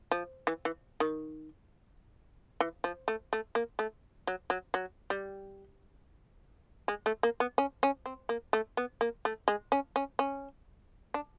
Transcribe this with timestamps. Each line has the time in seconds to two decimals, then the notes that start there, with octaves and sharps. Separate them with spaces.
0.11 F3
0.47 E3
0.65 E3
1.00 D#3
2.60 E3
2.84 F3
3.08 A3
3.33 A3
3.55 A#3
3.79 A3
4.27 F#3
4.50 F#3
4.74 F#3
5.10 G3
6.88 G#3
7.06 A3
7.23 A#3
7.40 B3
7.58 C#4
7.83 C#4
8.06 C4
8.29 A#3
8.53 A3
8.77 B3
9.01 A#3
9.25 A3
9.48 G#3
9.72 C#4
9.96 C#4
10.19 C#4
11.14 D4